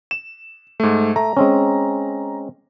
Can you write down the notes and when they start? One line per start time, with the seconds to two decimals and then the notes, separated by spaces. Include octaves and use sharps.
0.11 E7
0.80 G#2 A3
1.16 A3 A#5
1.37 G#3 C4 C#4